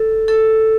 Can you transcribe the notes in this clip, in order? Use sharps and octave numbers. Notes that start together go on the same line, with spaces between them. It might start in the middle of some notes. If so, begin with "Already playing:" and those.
Already playing: A4
A4